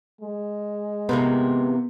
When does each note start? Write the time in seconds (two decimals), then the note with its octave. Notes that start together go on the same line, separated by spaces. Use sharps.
0.21 G#3
1.09 C3 E3 A#3 B3